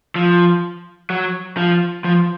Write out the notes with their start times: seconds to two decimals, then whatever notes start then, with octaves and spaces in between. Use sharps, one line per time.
0.16 F3
1.10 F#3
1.57 F3
2.04 F3